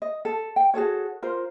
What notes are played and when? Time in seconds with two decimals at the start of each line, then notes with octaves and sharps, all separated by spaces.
0.02 D#5
0.25 A4
0.56 G5
0.74 F#4 G#4 A4 C#5
1.22 F4 A#4 C5